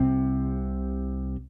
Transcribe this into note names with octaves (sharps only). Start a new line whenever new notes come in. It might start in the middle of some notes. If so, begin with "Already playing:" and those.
Already playing: C2 C3 C4